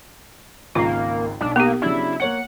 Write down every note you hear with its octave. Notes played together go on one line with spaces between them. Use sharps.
G#1 C#2 A#3 F4 C7
B1 D4
A#3 B3 G4
C#3 F#3 D4 E4
A#3 C#5 F#5 C#7